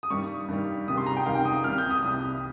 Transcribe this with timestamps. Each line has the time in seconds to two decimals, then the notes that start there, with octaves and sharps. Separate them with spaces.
0.03 D#6
0.10 G2 D#3 G3 C#6
0.48 G2 D#3 G3
0.88 C#2 C3 D#3 G3 D#6
0.98 C6
1.06 A#5
1.16 G5
1.26 C#2 C3 D#3 G3 F5
1.35 G5
1.45 D#6
1.55 D#6
1.64 C2 C3 G3 F6
1.78 G6
1.90 D#6
2.03 C2 C3 G3 D#6